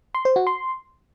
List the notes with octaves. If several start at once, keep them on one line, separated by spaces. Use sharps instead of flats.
C6
C5
F#4
C6